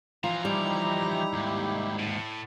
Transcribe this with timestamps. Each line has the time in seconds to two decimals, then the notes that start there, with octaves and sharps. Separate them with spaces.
0.24 E3 F3 F4 A#5
0.45 G3 D#4 E4 G4
1.33 D#2 G#2
2.00 A2